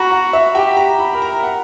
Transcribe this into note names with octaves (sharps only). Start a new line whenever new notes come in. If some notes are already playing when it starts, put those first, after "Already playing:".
Already playing: F#4 A#5 B5
F#5
E5
G4 G5
A#5
B5
A#4 B5
A#5
F#5